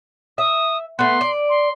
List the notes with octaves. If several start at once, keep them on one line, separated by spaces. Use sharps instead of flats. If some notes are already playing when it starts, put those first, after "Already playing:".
E5 D#6
A3 B3 C6
D5
C6